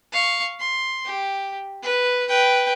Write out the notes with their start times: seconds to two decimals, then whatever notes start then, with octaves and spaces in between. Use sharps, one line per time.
0.13 F5 C#6
0.60 C6
1.05 G4
1.82 B4
2.28 B4 G5